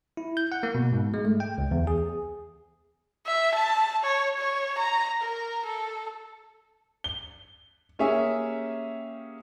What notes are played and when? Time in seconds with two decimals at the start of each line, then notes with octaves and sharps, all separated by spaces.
0.17 E4
0.37 G6
0.52 F#5
0.63 A#3
0.75 B2
0.93 G#2
1.14 G#3
1.25 A3
1.40 G5
1.58 C#2
1.71 E2
1.87 G#4
3.27 E5
3.55 A5
4.04 C#5
4.38 C#5
4.78 A#5
5.21 A#4
5.65 A4
7.04 G7
7.99 A#3 C#4 G4 G#4 E5 G#5